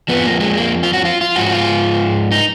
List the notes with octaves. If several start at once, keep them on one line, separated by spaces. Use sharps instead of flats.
F2 F3 B3
A#3
G#3
A#3
F4
F#4
F4
F4
G#2 F3 F#4
F4
D#4